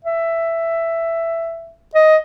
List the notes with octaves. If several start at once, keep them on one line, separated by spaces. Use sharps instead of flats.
E5
D#5